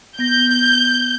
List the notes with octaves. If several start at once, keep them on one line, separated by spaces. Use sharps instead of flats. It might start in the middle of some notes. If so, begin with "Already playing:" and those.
B3 G6 A#6